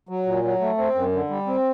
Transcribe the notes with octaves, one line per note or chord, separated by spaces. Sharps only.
F#3
A#2
F#3
A3
C4
F#2
D3
G3
C4